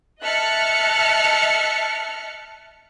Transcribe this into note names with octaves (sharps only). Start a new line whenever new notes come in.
D#5 E5 A5 F6 F#6 C#7